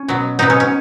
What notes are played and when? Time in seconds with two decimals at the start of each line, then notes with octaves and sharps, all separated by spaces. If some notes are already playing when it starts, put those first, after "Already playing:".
Already playing: C#4
0.08 B2 F#3 B3
0.39 B2 F#3 B3 D#4
0.50 C#4
0.60 C#4